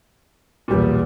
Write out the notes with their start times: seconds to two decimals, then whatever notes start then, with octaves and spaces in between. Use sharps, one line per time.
0.68 B1 E2 A#2 G3